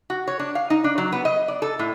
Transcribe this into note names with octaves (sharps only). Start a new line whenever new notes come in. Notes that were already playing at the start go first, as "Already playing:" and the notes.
F#4
C#5
D4
F5
D#4
D4
F#3
B3
D#5
D5
A4
A2